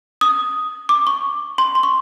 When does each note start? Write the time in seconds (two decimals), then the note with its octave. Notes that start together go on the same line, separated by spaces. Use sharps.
0.21 D#6
0.89 D6
1.07 C#6
1.58 C6
1.75 C6
1.83 C#6